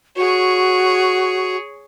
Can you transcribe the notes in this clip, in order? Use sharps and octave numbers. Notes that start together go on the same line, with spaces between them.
F#4 G#4 C#5